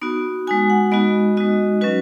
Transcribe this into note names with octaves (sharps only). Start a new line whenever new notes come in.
B3 D#4 F#4
G#3 D#4 F#4 G#5
F#5
G#3 B3 D#4 F#4 D#5
G#3 D#4 F#4 D#5
F#3 C#4 F#4 B4